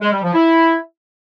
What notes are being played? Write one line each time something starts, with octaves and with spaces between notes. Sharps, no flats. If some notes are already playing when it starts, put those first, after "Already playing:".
G#3
G3
F3
E4